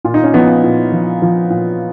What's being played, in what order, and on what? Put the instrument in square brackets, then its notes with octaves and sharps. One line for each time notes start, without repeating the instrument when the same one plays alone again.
[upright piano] A#2 F4
D#4
C#4
F3 B3 D#4
A#2
F3
F3
A#2